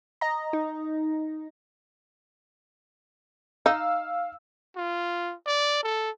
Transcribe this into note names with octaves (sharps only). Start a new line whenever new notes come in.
D#5 A#5
D#4
D#4 F5 E6
F4
D5
A4